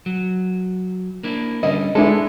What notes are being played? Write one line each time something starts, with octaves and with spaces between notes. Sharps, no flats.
F#3
A#3 D4 E4
D3 G3 C#4 D#5
G#3 B3 D4 E4 A4